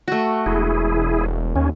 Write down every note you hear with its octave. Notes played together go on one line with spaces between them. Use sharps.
A3 F#4
E1 E4 G#4
D#2 C#4